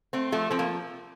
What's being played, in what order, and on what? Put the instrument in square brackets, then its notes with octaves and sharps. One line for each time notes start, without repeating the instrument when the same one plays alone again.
[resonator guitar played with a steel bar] A3 C4
F3 A3
F3 C4
A#3